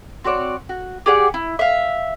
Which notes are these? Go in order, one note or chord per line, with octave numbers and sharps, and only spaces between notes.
C4 F#4 C#5 D5
F#4
G4 G#4 D5 F#5
E4
E5 F5